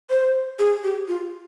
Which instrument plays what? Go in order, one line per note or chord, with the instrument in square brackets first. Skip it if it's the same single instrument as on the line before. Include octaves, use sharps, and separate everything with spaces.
[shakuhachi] C5
G#4
G4
F4